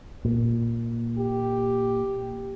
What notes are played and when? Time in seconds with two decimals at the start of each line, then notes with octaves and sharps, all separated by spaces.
0.25 A#2
1.19 G4